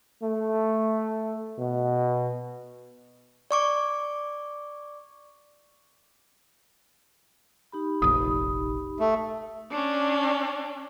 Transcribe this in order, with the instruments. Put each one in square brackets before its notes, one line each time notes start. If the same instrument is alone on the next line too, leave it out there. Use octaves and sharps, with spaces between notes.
[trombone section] A3
B2
[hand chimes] D5 C#6 D6
[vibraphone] D#4 G4 B5
[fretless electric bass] F1 A#1 [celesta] D#6
[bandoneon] A3
[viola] C#4 D4